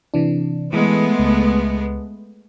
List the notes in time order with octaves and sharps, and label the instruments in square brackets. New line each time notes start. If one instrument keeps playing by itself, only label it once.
[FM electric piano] C3 E3 D4
[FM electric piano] E3 [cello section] G#3 A3 B3
[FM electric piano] C#2